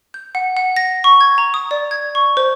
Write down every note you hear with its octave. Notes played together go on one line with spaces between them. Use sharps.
G6
F#5
F#5
A#6
C#6
G#6
A#5
D#6
D5
G#6
C#6
C5